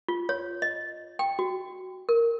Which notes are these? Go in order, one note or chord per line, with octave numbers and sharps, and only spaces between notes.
F4
C#5
D#5
G5
F#4
A#4